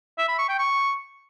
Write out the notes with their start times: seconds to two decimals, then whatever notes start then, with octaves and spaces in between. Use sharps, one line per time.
0.18 E5
0.28 B5
0.39 C#6
0.49 G5
0.59 C#6